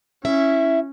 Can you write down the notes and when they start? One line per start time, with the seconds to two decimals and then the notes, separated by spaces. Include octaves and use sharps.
0.25 C#4 E4 E5